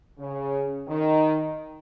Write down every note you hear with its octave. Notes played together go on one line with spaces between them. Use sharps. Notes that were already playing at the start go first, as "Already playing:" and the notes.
C#3
D#3